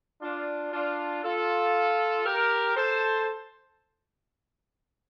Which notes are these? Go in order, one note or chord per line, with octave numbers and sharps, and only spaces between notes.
D4 F4
D4 F4
F4 A4
G4 A#4
A4 C5